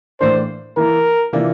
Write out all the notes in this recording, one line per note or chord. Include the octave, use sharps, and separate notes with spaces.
A2 E3 A#3 D4 C5
E3 A#3 E4 A#4
C3 E3 A#3 D4 F4